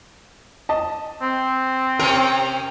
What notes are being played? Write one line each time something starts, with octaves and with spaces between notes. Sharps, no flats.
D#5 A5
C4
C3 C#4 A#4 G5